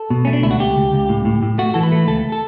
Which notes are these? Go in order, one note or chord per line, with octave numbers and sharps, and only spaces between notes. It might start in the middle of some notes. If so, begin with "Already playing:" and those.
Already playing: A4
B2
A3 C#4
D4
C#2 E4
F#4
C#2 G4
C#2
C#2
A2
A2
A2
A3 F#4
E3 A4
B4
A3
C#2 A4
A4